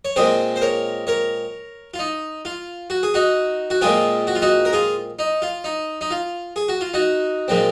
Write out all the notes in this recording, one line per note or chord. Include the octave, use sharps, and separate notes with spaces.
C#5
A#2 G#3 C4 G#4 C5
C5
A#4 C#5
A#4 C#5
F4
D#4
F4
F#4
G#4
D#4 F#4
F#4
A#2 G#3 C4 F4 G#4
F#4
F4
D#4 F#4
A#4
F4 G#4
D#4
F4
D#4
D#4
F4
G#4
F#4
F4
D#4 F#4
A#2 F3 G#3 C4